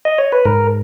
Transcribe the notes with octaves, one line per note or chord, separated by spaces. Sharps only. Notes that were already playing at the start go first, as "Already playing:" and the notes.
D#5
C#5
B4
G#2 A#4